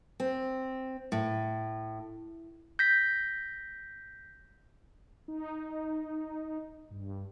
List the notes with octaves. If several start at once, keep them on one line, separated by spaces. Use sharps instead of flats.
C4
A2
G6 A#6 B6
D#4
G2